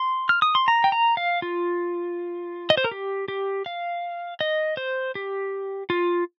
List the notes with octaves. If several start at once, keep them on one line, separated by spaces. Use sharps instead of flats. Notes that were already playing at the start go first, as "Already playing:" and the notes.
Already playing: C6
F6
D#6
C6
A#5
G5
A#5
F5
F4
D#5
C5
A#4
G4
G4
F5
D#5
C5
G4
F4